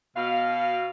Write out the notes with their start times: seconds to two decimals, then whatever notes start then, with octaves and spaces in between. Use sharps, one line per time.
0.16 B2 F5